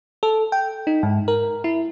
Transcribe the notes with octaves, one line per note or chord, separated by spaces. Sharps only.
A4
G5
D#4
G#2
A#4
E4